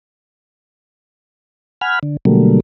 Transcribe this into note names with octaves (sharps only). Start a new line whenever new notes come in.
F#5 G#5 B5 F6
D3
B2 D3 F#3 G3 A3 A#3